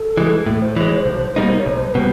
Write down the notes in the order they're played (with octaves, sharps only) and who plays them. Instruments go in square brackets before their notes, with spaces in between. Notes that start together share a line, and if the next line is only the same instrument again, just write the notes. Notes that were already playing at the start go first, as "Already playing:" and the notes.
Already playing: [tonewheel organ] A4
[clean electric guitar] E3 G#3
A2
[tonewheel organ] C5
[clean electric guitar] E3 G#3 [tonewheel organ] C#5
[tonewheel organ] C5
[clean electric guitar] B1
B2 G3 A#3 D#4
[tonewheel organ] C#5
[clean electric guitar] B1 [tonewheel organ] C5
[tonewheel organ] B4
[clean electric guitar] B2 G3